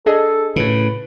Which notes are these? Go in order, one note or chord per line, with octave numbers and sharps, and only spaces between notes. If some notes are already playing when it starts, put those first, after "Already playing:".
D4 G#4 A4 D#5
A2 C#3 B4